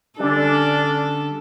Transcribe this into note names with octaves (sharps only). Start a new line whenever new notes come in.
D3 G3 C#4 D4 A4